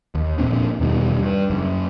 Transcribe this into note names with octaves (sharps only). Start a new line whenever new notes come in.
D#2
F1 A#2 C4 D4
E2 B2 D#3 G3
G2
F#2 C#3